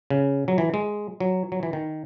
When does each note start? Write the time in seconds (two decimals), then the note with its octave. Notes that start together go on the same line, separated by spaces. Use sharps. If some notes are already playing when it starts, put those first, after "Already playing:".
0.10 C#3
0.48 F#3
0.58 E3
0.74 G#3
1.20 F#3
1.52 F#3
1.63 E3
1.73 D#3